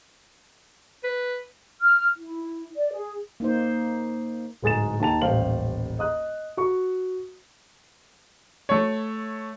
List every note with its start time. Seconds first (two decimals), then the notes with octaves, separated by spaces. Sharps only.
1.04 B4
1.81 F6
2.16 E4
2.76 D5
2.92 G#4
3.40 A#3 D#4 C5
4.62 D1 G#2 G#4 A6 E7
5.00 D#2 D#4 A5 F7
5.22 D#1 A1 C5 F5 F#7
5.99 D#5 D#6 F#6
6.57 F#4 C#6
8.69 A3 C#5